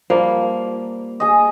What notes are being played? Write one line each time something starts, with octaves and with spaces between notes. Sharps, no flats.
F3 G3 A#3
G#4 D#5